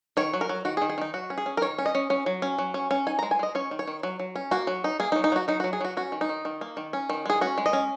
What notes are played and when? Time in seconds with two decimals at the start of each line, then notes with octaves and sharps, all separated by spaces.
0.17 D#3 C#5
0.33 F#3
0.41 A#4
0.49 F#3
0.65 D#3 F#4
0.77 G#4
0.82 D#3
0.90 G#4
0.98 D#3 D#4
1.14 F#3 F#4
1.30 C#4
1.38 G#4
1.46 C#4
1.57 A#4
1.62 D#3 C#5
1.78 C#4
1.86 D#5
1.95 C#4
2.10 C#4
2.26 F#3
2.42 C#4
2.58 F#3
2.74 C#4
2.91 C#4
3.07 D#4 G#5
3.19 A#5
3.23 G#3
3.31 G#5
3.39 G#3 D#5
3.55 C#4 C#5
3.71 D#3
3.79 C#5
3.87 D#3
4.03 F#3
4.20 F#3
4.36 C#4
4.51 A#3 F#4
4.67 F#3
4.84 D#4
5.00 A#3 G#4
5.12 D#4
5.16 F#3
5.24 D#4
5.32 F#3 F#4
5.48 F#3 D#4
5.60 F#4
5.64 F#3
5.73 G#4
5.81 F#3 F#4
5.97 C#4 F#4
6.12 D#3
6.21 D#4
6.29 D#3
6.45 D#3
6.61 A#3
6.77 D#3
6.93 C#4
7.10 D#3
7.26 G#3 G#4
7.41 C#4 F#4
7.58 G#3
7.66 D#5
7.73 C#4